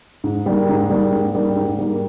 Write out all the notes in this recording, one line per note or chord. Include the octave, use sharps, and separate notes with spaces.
G#2
G3 A#3
G#2
G3 A#3
G#2
G3 A#3
G#2
G3 A#3